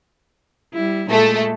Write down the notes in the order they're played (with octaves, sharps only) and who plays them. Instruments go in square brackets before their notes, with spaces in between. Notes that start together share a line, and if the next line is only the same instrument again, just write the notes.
[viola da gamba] G3 E4
[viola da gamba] A#2 G#3 [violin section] A3 A4